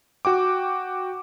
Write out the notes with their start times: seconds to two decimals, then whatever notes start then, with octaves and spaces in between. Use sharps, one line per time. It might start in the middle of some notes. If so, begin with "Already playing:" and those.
0.25 F#4 G5 D6